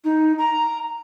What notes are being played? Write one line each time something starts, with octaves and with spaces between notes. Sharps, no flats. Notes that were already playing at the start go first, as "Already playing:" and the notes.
D#4
A#5